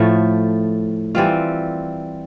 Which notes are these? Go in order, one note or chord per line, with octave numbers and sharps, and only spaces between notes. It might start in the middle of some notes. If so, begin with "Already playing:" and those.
Already playing: A2 F3 A3
E3 G3 C4 F4